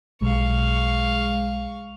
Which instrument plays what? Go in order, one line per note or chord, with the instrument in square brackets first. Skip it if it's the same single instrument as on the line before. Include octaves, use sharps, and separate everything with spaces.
[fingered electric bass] B1 [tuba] G#3 [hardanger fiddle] F5 C#6